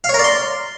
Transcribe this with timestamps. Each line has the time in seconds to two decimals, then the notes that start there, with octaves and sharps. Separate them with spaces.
0.04 F5
0.09 C#5
0.14 A#4
0.19 D5
0.24 C6